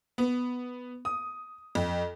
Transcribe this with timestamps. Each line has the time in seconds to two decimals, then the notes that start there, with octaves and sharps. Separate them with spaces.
0.18 B3
1.05 D#6
1.75 F2